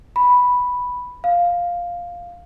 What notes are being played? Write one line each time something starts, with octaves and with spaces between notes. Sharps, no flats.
B5
F5